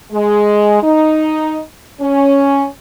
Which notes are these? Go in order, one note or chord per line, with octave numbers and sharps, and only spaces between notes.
G#3
D#4
C#4